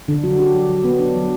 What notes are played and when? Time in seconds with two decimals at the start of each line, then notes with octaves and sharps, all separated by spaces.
0.08 D3 D4
0.24 F#3 F#4
0.39 D4 G4
0.55 F#3
0.70 F#3
0.84 B3
1.00 D4
1.16 F#3